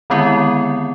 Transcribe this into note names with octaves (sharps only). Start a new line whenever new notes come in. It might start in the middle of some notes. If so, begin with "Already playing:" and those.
D3 D#3 G#3 B3 C4 E4